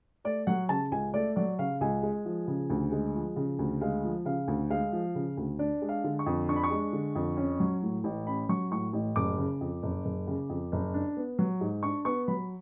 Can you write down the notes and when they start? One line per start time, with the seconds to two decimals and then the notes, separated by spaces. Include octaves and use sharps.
0.24 A3 D5
0.47 F#3 F#5
0.69 C#3 A5
0.91 C#2 G#5
1.14 A3 D5
1.36 F#3 D5
1.59 C#3 F5
1.81 C#2 G#5
2.03 G#3
2.25 F3
2.48 C#3
2.70 D2
2.92 G#3
3.15 F3
3.36 C#3
3.59 D2
3.81 G#3 F5
4.04 F3
4.25 C#3 F5
4.48 D2
4.70 G#3 F5
4.92 F3
5.15 C#3
5.37 D2
5.59 D4 D5
5.82 G#3
5.89 F5
6.04 D3
6.19 C#6
6.26 F2
6.49 D4 C#6
6.56 B5
6.64 C#6
6.71 G#3
6.93 D3
7.15 F2
7.37 C#4
7.60 F#3
7.82 A2
8.04 A1
8.27 C#4 B5
8.49 F#3 C#6
8.71 A2 C#6
8.93 A1
9.16 F#1 D6
9.38 C#3
9.61 F2
9.83 F#1
10.05 F#1
10.27 C#3
10.49 F2
10.72 F#1
10.94 D4
11.17 B3
11.39 F#3
11.61 G#2
11.83 D4 C#6
12.05 B3 C#6
12.28 F#3 B5